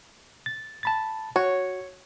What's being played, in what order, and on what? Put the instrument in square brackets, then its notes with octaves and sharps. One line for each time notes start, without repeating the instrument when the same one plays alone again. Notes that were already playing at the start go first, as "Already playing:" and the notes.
[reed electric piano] A6
A5 B5 A6
[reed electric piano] F#4 [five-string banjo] C#5